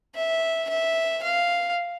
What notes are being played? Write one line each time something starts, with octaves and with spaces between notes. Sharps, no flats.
E5
E5
F5